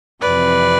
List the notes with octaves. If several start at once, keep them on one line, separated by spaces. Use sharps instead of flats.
F2 C3 E3 B4 D5